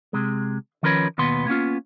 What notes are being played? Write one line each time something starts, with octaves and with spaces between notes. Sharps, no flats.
C3 G#3
D#3 F3 C#4 A#4 B4 C#5
D#2 B2 B3 B4 C6
A#3 B3 C#4 F4